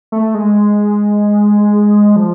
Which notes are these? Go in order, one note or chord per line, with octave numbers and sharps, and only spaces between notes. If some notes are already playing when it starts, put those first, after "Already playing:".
A3
G#3
F3